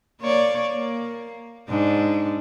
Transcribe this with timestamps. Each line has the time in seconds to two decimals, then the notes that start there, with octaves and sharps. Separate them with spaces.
0.21 A#3 C#5 D5
0.72 A#3
1.69 G#2 D4